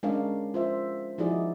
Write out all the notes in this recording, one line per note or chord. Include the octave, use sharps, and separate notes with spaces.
G#3 C#4 D4 A#4 C#5 F5
F4 C5 E5
F3 D#4 E4 F#4 G#4 D5